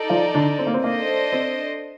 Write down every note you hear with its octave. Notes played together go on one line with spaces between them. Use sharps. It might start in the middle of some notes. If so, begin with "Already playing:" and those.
Already playing: D#4 A4 D5
F3 F4
D3 D4
C4
A#3
C4
A#3 D4 A4 C5 D#5
C4